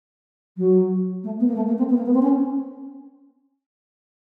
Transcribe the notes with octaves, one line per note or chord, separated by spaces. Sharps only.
F#3
A3
B3
A#3
A3
A#3
C4
B3
A#3
B3
C4
C#4